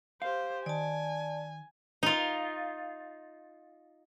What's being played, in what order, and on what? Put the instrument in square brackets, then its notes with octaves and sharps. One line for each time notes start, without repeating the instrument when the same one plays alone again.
[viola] G4 C5 [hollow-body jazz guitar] F5
[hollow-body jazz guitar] D#3 [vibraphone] D5 A5 [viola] G#5
[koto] D#4 F4